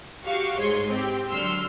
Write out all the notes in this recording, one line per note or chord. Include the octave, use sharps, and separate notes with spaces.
F#4 G4 F5 C#6
G#2 G#4 C#5 C6
C4 G4
D3 F#3 C6 E6 F6